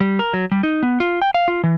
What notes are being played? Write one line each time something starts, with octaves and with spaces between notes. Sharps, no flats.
G3
A#4
F#3
G3
D#4
B3
F4
G5
F5
F4
E3